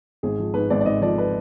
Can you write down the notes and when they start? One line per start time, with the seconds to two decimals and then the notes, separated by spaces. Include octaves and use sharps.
0.23 G#1 G#4
0.39 F3
0.54 G#2 B4
0.70 G#1 D5
0.81 D5
0.85 G#1 D#5
1.01 F3 D5
1.18 B4